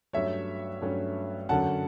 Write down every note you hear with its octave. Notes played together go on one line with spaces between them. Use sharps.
G2 F#3 A3 C#4 C#5 E5
G2 F#3 A3 C#4
F#2 D3 F#3 C#4 F#5 A5